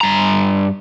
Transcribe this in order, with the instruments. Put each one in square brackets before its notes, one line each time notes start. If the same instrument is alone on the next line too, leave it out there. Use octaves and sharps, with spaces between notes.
[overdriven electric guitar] G2 A#5